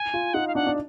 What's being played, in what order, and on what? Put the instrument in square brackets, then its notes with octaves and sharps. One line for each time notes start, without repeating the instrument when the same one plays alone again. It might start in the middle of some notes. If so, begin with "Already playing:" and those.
Already playing: [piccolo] G#5
[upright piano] F4
[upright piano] D#4 [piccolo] F#5
[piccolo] F5
[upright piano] D4 [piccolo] F#5
[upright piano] D4